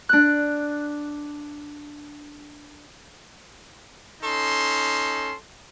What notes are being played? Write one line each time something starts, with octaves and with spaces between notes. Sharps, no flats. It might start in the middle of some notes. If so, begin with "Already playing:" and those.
D4 F#6
C#4 D#4 A4 C6